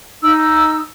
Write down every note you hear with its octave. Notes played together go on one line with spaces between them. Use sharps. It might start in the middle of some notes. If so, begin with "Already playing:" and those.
D#4 E6